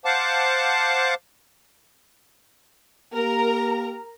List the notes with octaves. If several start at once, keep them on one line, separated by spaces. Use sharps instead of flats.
C5 F5 F#5 A5 D6
A#3 G4 A#4 A#5